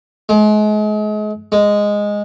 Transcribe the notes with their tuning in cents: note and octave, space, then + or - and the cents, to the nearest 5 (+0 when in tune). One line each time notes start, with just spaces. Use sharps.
G#3 +35
G#3 -10